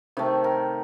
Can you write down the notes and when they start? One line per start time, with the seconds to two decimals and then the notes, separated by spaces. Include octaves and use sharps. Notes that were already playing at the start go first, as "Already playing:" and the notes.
0.17 C3 D#3 A3
0.44 A#4